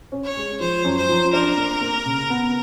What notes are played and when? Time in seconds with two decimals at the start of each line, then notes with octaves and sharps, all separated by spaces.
0.12 C#4
0.24 C#5
0.37 G#3
0.60 F3 C5
0.85 F#2
0.97 C5
1.09 F3
1.33 D4 A#4
1.57 A#3
1.81 A#3
2.06 C#3
2.30 B3